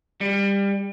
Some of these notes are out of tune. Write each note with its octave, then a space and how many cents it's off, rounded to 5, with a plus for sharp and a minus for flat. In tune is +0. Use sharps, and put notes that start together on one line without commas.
G3 +20